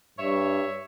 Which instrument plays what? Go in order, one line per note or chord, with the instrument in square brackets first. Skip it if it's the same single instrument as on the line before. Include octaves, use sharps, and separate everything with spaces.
[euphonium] G2 [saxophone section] C#5 E5